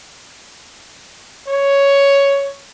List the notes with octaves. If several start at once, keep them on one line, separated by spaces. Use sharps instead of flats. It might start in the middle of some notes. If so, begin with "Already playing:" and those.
C#5